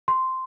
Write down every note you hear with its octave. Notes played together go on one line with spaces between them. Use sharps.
C6